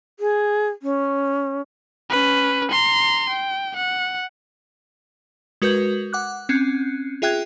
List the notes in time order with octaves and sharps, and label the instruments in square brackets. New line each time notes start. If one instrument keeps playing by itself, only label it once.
[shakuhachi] G#4
C#4
[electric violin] C#4 B4
A#5 C6
G5
F#5
[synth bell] G#3 F#4 A#4 B4 G6
F#5 D6 F#6
C4 C#4 F#6
F4 G#4 E5 G5 F#6 G#6